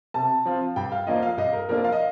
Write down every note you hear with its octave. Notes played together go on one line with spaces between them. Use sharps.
C3 A5
F3 C4 F4
G2 G5
F5
F3 A#3 D4 F4 D#5
F5
G2 D#5
A#4
F3 A#3 D4 F4 A#4
F5
D#5